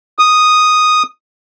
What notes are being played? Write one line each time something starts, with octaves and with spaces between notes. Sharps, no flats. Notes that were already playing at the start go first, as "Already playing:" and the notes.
D#6